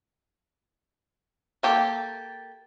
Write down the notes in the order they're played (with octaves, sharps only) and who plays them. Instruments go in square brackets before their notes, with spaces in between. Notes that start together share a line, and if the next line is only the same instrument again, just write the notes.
[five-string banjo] A#3 G4 A4